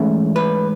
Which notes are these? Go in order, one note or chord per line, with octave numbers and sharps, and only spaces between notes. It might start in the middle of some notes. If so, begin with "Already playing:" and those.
Already playing: G#2 E3 A3 C#4 E4
B4